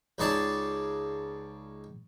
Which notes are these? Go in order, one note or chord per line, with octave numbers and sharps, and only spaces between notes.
C#2 C#3 D#4 G#4 D5 A5